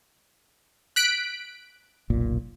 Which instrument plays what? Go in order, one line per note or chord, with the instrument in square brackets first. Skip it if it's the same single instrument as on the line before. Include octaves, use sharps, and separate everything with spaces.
[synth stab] F#6 B6 D7
[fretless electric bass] F1 B1 A#2